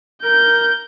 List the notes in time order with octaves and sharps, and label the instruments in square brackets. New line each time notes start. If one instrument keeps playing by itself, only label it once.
[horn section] A#4 [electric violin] G6